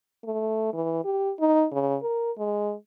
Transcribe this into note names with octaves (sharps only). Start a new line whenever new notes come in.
A3
E3
G4
D#4
C#3
A#4
G#3